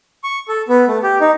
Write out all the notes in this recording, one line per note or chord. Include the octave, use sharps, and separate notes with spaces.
C#6
A4
B3
A3
G4
D#4